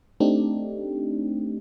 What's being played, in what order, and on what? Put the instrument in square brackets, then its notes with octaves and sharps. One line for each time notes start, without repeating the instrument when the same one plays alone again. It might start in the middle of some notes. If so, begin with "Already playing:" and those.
[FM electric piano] A3 C4 D4 D#4 G4